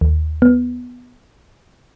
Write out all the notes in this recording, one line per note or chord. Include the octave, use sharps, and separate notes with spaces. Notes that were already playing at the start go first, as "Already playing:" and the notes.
D#2
B3